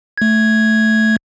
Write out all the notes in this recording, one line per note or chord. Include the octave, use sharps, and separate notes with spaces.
A3 G#6